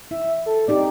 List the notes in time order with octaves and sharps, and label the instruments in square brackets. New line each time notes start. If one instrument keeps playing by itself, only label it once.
[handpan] E4 [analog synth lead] E5
[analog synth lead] A4
[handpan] C4 D#4 G4 [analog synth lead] D5